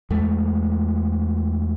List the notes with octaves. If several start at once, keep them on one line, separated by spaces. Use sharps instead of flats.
E2 G#3 A3